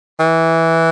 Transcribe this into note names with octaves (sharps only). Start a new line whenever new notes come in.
E3